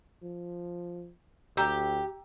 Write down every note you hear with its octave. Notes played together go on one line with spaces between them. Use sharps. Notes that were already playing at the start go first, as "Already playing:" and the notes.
F3
D2 G4 G5 A#5 E6